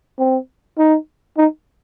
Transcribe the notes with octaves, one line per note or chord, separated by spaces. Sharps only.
C4
D#4
D#4